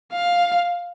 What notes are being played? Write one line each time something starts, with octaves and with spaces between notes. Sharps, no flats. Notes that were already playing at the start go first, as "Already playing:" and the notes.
F5